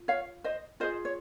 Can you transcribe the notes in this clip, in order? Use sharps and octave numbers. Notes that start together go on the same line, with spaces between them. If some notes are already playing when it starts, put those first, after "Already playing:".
Already playing: F4
C#5 F5
C5 D#5
F4 G#4 C5 D#5
C#5